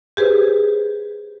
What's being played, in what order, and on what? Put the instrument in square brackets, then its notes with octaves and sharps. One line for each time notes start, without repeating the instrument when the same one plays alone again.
[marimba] G4 G#4 B4 C5